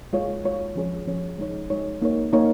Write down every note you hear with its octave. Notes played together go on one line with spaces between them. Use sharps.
G#3 F4 C#5
G#3 F4 C#5
F3 C#4 G#4 C#5
F3 C#4 G#4 C#5
G#3 D#4 C#5
G#3 D#4 C#5
A#3 D#4 A#4 C#5
A#3 D#4 A#4 C#5